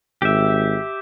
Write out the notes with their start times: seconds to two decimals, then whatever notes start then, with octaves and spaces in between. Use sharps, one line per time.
0.22 G#1 G4 E5